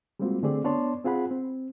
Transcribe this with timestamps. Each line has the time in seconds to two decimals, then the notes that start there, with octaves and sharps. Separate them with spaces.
0.19 G3 G#3 A#3 C4 F4 F#4
0.43 D3 A3 C4 G4 G#4 D5
0.64 B3 D4 C#5 D5 A5 C6
1.04 C4 F4 G#4 F#5 B5
1.31 C4